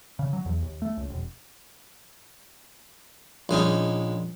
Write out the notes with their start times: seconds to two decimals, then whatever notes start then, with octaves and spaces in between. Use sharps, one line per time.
0.19 C#3
0.33 F#3
0.46 E2
0.62 D#2
0.82 A3
0.97 C#2
1.10 E1
3.49 A#1 G#3 C#4 D#4